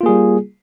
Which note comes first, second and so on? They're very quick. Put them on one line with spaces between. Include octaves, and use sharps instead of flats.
F4 A#3 G#4 G3